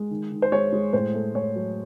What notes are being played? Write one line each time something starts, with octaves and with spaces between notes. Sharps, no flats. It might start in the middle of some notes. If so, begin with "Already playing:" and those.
Already playing: G#3
D#3
D#3
C5
G#3 C#5
G#3
A2 C5
A3
A2 C#5
F#3